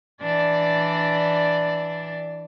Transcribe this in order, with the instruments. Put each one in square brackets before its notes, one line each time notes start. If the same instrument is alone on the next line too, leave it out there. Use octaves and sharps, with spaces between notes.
[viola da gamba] E3 D4 D5